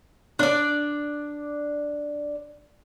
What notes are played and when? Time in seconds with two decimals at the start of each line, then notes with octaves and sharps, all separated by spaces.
0.39 D4 D5